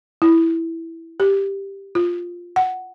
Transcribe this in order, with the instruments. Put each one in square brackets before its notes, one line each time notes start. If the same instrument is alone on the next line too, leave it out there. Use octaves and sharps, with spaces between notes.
[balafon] E4
G4
F4
F#5